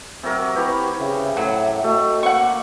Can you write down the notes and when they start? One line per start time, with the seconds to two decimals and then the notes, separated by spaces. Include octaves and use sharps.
0.23 C3 F#3 A#4
0.56 E4 G4 B4 C#5 B5
0.99 C#3 E5
1.37 A2 F#3
1.84 A3 F#4 D#5
2.23 A#3 F#5 C#6